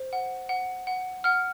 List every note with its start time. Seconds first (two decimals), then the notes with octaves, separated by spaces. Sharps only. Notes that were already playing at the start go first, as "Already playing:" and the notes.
Already playing: C5
0.13 F#5
0.49 F#5
0.87 F#5
1.24 F#5 F6